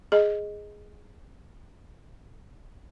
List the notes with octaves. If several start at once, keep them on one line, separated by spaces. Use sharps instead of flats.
G#4 D#5